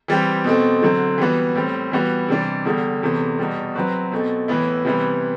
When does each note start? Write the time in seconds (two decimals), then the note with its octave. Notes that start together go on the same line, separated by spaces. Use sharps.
0.08 E3 G3 C4 G4
0.44 B2 A3 C4
0.82 D3 F#3 C4
1.18 E3 G3 B3 F#4
1.55 A2 G3 C4
1.92 E3 G3 B3 F#4
2.28 C3 E3 G3 D4
2.65 E2 D3 G3
3.02 E2 C3 E3 A3
3.39 E2 B2 G3
3.75 F#3 C4 F#4 B4
4.12 B2 A3 C4
4.48 A2 E3 B3 E4
4.85 C3 E3 G3 B3 E4